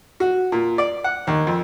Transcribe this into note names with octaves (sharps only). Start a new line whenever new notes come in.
F#4
A#2
D5
F#5
D#2
F2